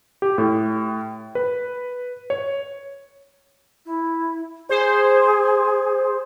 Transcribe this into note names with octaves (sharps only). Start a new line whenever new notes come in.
G4
A2
B4
C#5
E4
G#4 C5